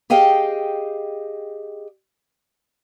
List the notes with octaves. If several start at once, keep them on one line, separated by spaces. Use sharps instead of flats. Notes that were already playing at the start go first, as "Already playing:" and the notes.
G4 G#4 D#5 F5 G5